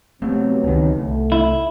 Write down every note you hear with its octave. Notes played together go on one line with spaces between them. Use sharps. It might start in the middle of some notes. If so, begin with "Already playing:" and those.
C3 F#3 A3 B3 C4
C#2 D#3
C2 A3
E4